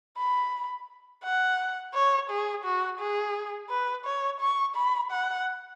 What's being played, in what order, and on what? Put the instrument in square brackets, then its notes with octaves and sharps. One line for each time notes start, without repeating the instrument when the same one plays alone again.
[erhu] B5
F#5
C#5
G#4
F#4
G#4
B4
C#5
C#6
B5
F#5